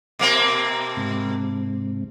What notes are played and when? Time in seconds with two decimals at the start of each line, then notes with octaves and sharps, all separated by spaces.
0.19 B2 A#3 C4
0.97 G#2 C3